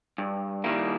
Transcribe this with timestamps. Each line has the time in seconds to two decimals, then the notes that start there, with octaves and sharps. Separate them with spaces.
0.18 G2
0.64 D#3 G3 A#3 E4